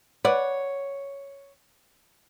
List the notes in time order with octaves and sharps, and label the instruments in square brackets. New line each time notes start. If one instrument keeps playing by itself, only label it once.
[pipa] B4 D5 F#5 [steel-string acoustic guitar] C#5